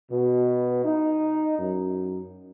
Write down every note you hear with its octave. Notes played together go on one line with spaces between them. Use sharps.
B2
D#4
F#2